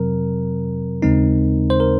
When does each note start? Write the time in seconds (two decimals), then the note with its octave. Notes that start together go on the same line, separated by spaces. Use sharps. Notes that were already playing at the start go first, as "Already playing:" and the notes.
Already playing: F2 C3 F#3 C4 A#4
1.02 D#2 C#3 G#3 C4 D#4
1.70 C5
1.80 A#4